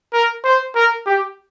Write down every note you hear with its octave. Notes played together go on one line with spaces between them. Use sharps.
A#4
C5
A#4
G4